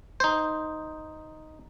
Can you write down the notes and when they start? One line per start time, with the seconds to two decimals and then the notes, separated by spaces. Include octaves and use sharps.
0.20 D#4 C5